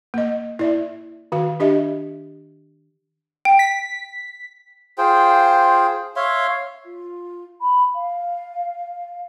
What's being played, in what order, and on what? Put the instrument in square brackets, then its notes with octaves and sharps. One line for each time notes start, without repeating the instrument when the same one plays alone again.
[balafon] A#3 D#5
E4 D5 E5
D#3 F#4 F5
D4 G4 D#5 E5
[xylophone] G5
[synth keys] B6
[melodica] F4 G#4 C5 G5
C#5 E5 F5 C6
[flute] F4
B5
F5